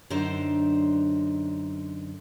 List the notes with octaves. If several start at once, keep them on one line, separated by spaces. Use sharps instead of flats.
F#2 D3 D4 D#4 C5